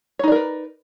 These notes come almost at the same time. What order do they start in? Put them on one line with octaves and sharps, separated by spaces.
C#5 D#4 D5 A#4 B4